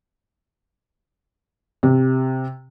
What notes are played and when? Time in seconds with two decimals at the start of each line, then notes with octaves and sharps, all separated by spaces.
1.83 C3